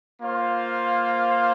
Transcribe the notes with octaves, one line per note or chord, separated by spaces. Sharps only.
A#3 F4 C5 F5